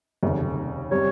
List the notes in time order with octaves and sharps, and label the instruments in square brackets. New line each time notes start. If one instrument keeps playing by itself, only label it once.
[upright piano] F1 D#2 C#3
[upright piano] C3 G3 [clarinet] C#5